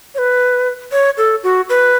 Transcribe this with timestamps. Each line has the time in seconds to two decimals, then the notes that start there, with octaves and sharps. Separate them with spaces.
0.15 C#5
0.18 B4
0.92 C#5
1.18 A4
1.43 F#4
1.69 B4